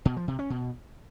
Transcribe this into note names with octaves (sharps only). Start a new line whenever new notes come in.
B2
F3
C3
C#4
B2